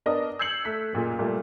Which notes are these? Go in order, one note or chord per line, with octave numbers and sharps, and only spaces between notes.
B3 D4 A#4 D5 D#5
E6 G6 G#6 C7 C#7 F#7
A3 F#6 B6
F#1 A#2 G#4
A#2 G3 A3